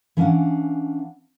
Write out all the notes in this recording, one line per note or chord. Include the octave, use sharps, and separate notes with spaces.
E3 C#4 D4 F5 F#5